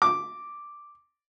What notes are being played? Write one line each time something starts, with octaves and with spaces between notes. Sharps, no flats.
D6